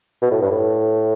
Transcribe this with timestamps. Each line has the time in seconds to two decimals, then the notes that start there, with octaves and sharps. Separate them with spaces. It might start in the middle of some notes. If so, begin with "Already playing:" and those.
0.22 B2
0.32 A2
0.42 G2
0.51 A2